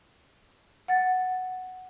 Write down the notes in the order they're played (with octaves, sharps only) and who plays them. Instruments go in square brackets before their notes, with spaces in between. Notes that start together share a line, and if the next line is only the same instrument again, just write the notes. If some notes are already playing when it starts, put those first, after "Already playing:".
[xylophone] F#5 A6